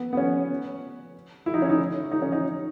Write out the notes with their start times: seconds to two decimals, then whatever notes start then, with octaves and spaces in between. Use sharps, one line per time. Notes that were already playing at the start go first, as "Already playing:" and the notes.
Already playing: B3
0.13 B3
0.17 C#4
1.46 E4
1.54 D#4
1.62 C#4
1.69 D#4
2.11 D#4
2.22 C#4
2.32 D#4